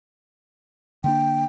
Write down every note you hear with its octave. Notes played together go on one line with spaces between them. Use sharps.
D3 A#3 D4 G5